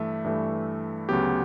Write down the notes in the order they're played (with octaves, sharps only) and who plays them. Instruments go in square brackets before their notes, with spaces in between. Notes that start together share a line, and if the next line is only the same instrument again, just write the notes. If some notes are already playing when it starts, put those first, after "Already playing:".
Already playing: [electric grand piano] G2 E3 A3 E5
G2 E3 A3
D2 C#3 F#3 B3 G4